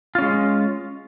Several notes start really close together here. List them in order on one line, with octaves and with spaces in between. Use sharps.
F4 C#4 G#3